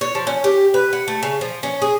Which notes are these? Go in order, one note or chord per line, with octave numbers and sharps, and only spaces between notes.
C#5
F3
C#4
G4
B4
F#5
A3
C#3
F3
C#4
G#4